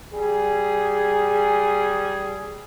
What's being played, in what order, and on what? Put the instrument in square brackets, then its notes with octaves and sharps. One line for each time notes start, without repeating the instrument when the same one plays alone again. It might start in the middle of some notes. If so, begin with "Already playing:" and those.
[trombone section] G3 G#4